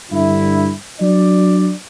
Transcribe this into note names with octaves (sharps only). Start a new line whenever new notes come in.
G2 D3 E4
F#3 D4 D5